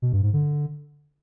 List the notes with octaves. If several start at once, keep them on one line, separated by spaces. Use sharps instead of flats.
B2
G2
G#2
D3